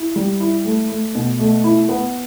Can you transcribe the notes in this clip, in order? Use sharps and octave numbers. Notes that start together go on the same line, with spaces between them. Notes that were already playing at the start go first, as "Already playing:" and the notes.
Already playing: E4
G3
E4
A3
A3
B2
A3
E4
B3